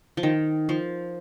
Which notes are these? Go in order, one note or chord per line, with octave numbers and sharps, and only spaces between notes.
F3
D#3
F3